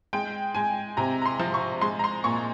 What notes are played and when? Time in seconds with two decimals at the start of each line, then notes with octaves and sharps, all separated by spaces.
0.13 G#3 G5
0.55 G#3 G#5
0.97 C3 A#5
1.22 A#5
1.26 C6
1.40 F3
1.54 C#6
1.81 G#3 C6
1.99 A#5
2.04 C6
2.24 A#2 C#6